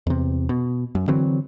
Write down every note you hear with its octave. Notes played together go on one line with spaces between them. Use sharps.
E2 C3
B2
F#2
D3 E3 F#3 C4